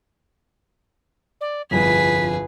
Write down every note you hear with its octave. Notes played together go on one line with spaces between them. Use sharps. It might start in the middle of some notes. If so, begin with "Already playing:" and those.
D5
G1 C2 F2 G#4 B4 B6